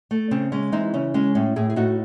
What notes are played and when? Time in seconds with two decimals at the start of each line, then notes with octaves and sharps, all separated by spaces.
0.11 A3
0.31 C#3 C4
0.52 G#3 C#4
0.72 E3 C4 D#4
0.94 C#3 C#4
1.14 G#3 C#4
1.35 A2 C#4
1.56 A2 E4 G#4
1.70 G#4
1.76 A2 D#4 F#4